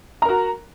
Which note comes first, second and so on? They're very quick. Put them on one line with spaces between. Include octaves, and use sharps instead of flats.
A#5 A#4 F#4